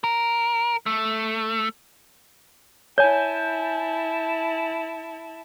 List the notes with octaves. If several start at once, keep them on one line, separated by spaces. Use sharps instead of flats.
A#4
A3
E4 C#5 G#5 A5 G6